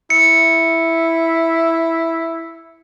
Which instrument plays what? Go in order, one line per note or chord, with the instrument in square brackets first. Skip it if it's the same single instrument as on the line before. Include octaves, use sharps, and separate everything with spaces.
[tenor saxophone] E4 [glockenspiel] C#7